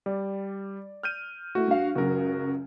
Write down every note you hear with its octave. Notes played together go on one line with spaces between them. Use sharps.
G3 D5
F6 G6 D#7
A3 E4 F#4
G2 F5
C#2 F#2 C#3 F#4 A#4